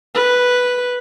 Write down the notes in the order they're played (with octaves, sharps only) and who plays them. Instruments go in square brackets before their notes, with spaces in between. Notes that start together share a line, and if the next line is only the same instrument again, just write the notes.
[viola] B4